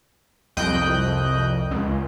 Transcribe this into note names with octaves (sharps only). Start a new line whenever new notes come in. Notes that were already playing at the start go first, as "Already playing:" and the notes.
C2 F2 D#5 G5 F#6 G6
C#2